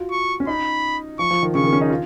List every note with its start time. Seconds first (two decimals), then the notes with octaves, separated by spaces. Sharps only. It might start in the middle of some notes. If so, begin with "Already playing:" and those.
Already playing: F4 F#4
0.11 C#6
0.40 C#4
0.47 D#4 B5
1.19 F3 C#6
1.31 F3
1.43 D#3
1.54 C#3 C#6
1.64 D#3
1.73 C#4
1.81 D#4
1.90 F4